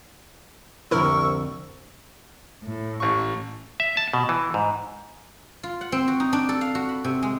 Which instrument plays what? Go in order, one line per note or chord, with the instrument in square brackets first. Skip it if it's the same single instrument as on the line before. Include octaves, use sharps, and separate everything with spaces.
[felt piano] F1 D3 [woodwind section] C2 [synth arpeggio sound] E4 A#4 [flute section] C#6 E6
[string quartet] A2
[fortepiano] A1 C#6
[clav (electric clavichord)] E5
A5
B2
E3
G#2
[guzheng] F4
F#5
C4
F#4
D#4
D4
A4
F5
F#4
B5
C3
G#3